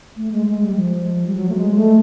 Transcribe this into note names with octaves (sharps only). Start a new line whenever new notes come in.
A3
G#3
G#3
G3
F3
G3
F#3
A3
G#3
A3